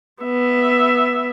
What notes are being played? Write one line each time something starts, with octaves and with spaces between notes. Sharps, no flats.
B3 E5